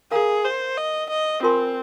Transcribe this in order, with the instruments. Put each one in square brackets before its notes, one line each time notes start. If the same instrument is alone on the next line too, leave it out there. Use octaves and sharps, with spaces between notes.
[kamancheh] G#4 [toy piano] A#4 F5 A#5
[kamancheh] C5
D#5
D#5
[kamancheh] C4 [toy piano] F4 A#4 G#5 C6